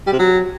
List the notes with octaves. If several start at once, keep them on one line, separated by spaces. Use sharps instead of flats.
G3
C3
F#3